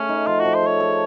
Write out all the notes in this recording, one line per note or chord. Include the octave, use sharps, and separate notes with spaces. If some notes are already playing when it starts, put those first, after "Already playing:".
Already playing: A3 C#4
D#4
F3 F4
F#4
F3
C5
A4 C#5
A4